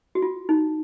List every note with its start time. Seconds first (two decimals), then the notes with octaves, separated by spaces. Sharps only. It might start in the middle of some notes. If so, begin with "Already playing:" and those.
0.15 F#4
0.22 F4
0.49 D#4